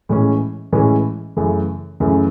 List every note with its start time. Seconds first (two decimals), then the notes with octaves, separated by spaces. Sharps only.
0.09 A2 E3 G#3 C#4
0.73 A2 E3 G#3 C#4
1.37 F#2 C#3 E3 A3
2.00 F#2 C#3 E3 A3